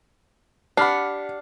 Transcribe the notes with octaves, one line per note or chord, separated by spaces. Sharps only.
D4 G4 F#5 B5 F6 C7